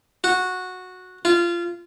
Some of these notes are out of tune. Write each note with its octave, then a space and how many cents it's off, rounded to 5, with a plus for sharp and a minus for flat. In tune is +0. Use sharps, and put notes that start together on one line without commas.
F#4 -10
F4 -20